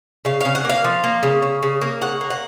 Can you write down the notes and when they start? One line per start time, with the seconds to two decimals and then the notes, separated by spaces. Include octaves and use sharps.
0.25 C#3 F5
0.41 C#3 F5
0.55 F#5
0.65 A#3 F5
0.84 F3
1.04 A#3
1.23 C#3
1.42 C#3
1.63 C#3
1.81 A#3
2.01 C#3 F#5
2.21 A#3
2.30 F#5